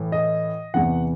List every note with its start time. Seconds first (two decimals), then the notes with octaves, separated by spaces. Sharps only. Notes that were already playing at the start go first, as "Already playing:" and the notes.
Already playing: A2 E3
0.12 D#5
0.74 E2 C3 E3 F#5